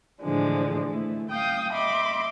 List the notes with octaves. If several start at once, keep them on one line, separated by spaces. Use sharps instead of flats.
A2 D3 E3 F3 G#3 D4
A3 E4
F5 G5 D#6 G6
D#5 E5 B5 C6 D6